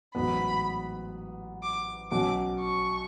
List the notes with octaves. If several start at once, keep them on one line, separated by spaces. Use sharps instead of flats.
A1 G#2 F#3 B3 B5
D6
B1 B2 F#3 C#4 F#4 D6
C#6